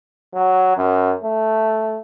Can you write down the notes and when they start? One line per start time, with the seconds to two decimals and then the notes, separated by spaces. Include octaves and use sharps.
0.34 F#3
0.77 F#2
1.23 A3